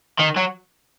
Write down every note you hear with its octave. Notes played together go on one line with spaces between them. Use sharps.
D#3
F#3